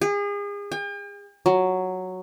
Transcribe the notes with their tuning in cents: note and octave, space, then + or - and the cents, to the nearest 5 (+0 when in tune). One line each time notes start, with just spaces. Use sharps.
G#4 -35
G5 +45
F#3 +0